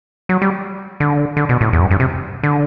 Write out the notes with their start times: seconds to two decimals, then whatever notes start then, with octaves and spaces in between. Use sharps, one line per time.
0.29 F#3
0.42 G3
1.00 D3
1.37 D3
1.49 B2
1.61 A2
1.73 E2
1.81 F#2
1.91 G2
2.00 C3
2.43 D3